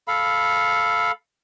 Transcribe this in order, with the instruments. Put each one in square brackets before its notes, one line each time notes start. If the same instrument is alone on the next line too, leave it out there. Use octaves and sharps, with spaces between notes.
[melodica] A4 F5 B5